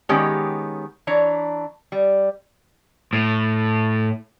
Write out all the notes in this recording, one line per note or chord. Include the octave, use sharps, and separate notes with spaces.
D#3 G#3 B3 C#4 G4 C#5
E3 D4 C#5 A#5
G3
A2